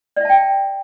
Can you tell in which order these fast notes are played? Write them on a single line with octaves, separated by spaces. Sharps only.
D5 E5 A5 G5